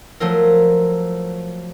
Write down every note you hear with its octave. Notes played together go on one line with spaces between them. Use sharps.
F3 F#3 A3 F4 A#4